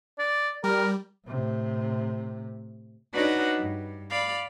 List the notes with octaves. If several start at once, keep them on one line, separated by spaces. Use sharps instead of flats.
D5
G3 A#4
A2 C3
D4 D#4 F#4 B4 C#5 F#5
G2
D5 F5 B5